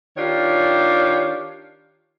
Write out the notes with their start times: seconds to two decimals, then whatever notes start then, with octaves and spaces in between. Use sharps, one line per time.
0.17 D#3 D4 F4 G4 C#5